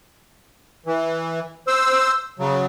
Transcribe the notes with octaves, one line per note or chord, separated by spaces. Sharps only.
E3
C5 E6
C#3 F#3